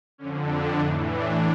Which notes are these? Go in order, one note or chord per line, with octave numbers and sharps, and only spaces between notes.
F2 D3 C#4
D4
A2 E3 D#4
D4